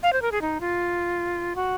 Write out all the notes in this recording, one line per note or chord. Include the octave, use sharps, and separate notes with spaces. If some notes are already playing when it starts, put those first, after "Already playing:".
F5
C5
A#4
G#4
D#4
F4
F#4